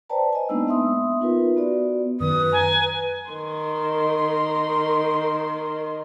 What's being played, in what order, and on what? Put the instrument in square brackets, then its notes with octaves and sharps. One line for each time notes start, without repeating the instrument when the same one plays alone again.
[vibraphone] B4 C5 D5 G5 A5 A#5
D#5 G#5
G#3 A#3 B3 D4 D#4 E6
B3 E5 C6 D#6
D#4 F4 A#4 B4
B3 F#4 D5
[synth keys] F#2 D#3 [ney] B4 [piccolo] D#6
[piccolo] G#5 [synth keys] A#5
[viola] D#3 C6